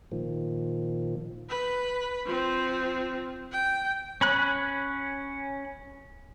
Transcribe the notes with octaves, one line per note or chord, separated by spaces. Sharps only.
A#2 D#3 F3
B4
F3 C4
G5
C#4 B5 F#6